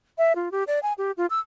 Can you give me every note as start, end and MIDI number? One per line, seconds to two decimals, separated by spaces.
0.18 0.33 76
0.36 0.51 65
0.52 0.64 67
0.67 0.79 74
0.83 0.93 80
0.98 1.12 67
1.17 1.26 65
1.30 1.39 88